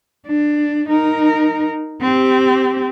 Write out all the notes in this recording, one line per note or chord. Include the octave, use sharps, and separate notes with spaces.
D4
D#4 A#4
C4 G4